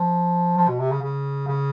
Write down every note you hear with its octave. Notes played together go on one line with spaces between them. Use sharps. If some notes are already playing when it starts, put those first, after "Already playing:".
Already playing: F3
F3
B2
C3
C#3
C#3
C#3